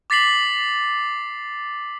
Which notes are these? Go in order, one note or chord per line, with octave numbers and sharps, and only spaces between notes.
D6 A6 B6 C7 F#7